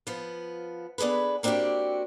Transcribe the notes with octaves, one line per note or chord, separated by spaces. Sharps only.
F3 B3
B3 D4 G#4 A4 B4
A#3 C4 D4 E4 F#4 G4